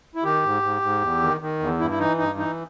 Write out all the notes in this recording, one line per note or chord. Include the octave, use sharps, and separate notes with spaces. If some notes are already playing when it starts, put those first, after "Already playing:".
E4
D#3 G4
G#2
G#2
G#2
E2
D#3
D#3
E2
G2 E4
E4
E3 D#4
G2 D#4
E3 D#4